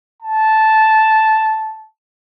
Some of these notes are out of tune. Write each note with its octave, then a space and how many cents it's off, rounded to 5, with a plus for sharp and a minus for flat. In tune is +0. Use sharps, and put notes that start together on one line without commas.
A5 -5